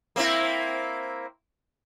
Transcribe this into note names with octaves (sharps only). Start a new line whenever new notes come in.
A#3 C4 E4